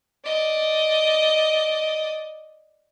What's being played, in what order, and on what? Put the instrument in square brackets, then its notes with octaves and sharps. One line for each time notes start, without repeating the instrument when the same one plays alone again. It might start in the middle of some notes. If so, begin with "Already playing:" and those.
[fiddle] D5 D#5